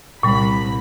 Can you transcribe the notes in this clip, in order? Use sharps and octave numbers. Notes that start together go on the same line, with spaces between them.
C2 A#2 G3 B5